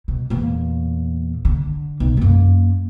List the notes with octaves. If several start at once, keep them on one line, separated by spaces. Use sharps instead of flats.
B2
E2 A#2
D3
B1
F#2 A#3